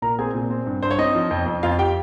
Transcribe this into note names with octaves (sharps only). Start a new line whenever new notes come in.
A#2 A#4 A#5
C4 G#4 G#5
A#2
C4
G2
G2 C5
C#5
C4 D#4 D#5
F3
F2
F2
F2 F4 F5
G4 G5